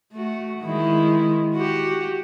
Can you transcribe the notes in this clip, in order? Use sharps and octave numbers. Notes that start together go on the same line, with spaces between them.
A3 F#4
D#3 G#3 E4
F#4 G4